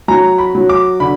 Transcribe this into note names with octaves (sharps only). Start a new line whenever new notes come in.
F#3 A#5
B5
F#3
D6
D3 B5